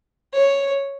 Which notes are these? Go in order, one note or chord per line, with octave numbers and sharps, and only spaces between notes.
C#5